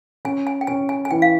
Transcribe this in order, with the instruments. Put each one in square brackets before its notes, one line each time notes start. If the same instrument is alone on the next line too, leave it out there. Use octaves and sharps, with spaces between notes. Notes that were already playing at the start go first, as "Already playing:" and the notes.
[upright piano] C#4 [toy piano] G#5
[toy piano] G#5
G5
[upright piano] C#4 [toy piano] G#5
[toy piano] G#5
G#5
[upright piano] E3 [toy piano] G5
[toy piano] F5